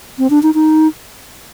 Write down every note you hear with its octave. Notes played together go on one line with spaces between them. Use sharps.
C4
D4
D#4
D#4